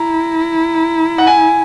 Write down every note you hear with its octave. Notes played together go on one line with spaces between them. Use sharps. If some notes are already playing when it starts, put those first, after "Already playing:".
Already playing: E4 A#5
F#5
G#5